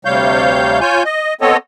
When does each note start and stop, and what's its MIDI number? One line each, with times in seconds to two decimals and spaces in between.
0.05 0.80 38
0.05 0.80 48
0.05 0.80 55
0.05 0.80 73
0.05 0.80 77
0.05 0.80 91
0.81 1.03 65
0.81 1.03 73
0.81 1.03 80
0.81 1.03 91
1.05 1.34 75
1.41 1.57 59
1.41 1.57 60
1.41 1.57 69
1.41 1.57 73
1.41 1.57 75